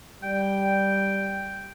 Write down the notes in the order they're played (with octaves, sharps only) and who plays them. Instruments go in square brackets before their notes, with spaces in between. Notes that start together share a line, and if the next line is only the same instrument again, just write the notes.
[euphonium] G3 [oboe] G5